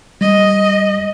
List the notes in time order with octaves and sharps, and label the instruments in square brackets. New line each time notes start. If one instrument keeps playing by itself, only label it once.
[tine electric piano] G3 [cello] D#5